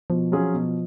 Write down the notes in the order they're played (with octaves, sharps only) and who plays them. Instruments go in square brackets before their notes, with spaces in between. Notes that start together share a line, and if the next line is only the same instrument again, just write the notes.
[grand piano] B2 [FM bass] F3
[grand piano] F#3 C#4 F4 G#4
B2